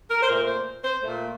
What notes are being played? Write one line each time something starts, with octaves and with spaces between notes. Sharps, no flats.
A#4
C5
A#2 A3 A#4
C5
C5
A#2 A3